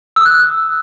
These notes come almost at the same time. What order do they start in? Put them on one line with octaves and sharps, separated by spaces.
E6 D#6 F#6